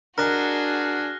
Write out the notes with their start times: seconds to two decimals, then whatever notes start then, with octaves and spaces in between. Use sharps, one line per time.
0.18 D4 F#4 G#4 A#4 D#5 F6 F#6 A#6